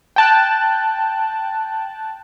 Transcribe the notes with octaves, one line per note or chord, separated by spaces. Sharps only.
G5 A5 F#6